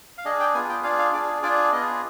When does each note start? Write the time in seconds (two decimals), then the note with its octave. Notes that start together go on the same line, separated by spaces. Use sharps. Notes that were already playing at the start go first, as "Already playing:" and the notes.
0.18 F5
0.25 D4 G#4 D#5
0.40 G5
0.54 B3 F4 G#4 G#5
0.69 G5
0.84 D4 F4 G#4 F5
0.99 F5
1.12 D4 G#4 D5
1.42 D4 F4 G#4 D5
1.72 B3 F4 G#4 D#5